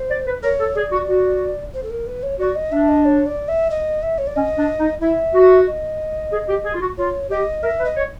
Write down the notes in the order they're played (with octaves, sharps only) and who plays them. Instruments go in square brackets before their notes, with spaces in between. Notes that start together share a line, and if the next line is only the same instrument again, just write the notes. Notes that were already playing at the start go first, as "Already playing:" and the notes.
Already playing: [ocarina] C5
[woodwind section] D5
B4
[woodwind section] A#4 [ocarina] C#5
[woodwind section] A4
[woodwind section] G#4 [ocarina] D5
[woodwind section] F#4
F#4
[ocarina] C5
A4
A#4
B4
C#5
[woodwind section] F#4 [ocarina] D5
[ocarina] D#5
[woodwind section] D4 [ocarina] E5
[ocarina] D#5
C#5
D5
E5
D#5
E5
C#5
D5
[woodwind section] C#4 [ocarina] D#5
[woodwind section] D4
D#4
[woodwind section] E4 [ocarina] E5
[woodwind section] F#4
[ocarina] D#5
[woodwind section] G#4
G4
G#4
F4
F#4
[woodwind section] F4 [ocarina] C#5
[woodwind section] G4 [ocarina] D#5
[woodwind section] A#4 [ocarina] E5
[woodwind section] B4
[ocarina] D#5
[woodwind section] C#5